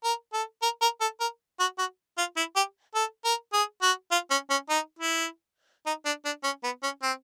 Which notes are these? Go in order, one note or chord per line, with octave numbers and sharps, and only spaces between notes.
A#4
A4
A#4
A#4
A4
A#4
F#4
F#4
F4
E4
G4
A4
A#4
G#4
F#4
F4
C#4
C#4
D#4
E4
D#4
D4
D4
C#4
B3
C#4
C4